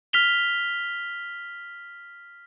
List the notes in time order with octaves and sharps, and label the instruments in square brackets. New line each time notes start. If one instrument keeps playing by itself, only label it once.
[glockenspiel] F6 B6 F7 G7